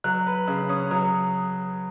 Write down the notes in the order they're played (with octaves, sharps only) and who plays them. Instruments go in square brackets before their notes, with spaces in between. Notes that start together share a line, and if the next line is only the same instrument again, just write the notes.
[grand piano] F#3 [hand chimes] F#6
[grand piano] B4
C#3
[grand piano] C#4 [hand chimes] D#6
[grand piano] F#3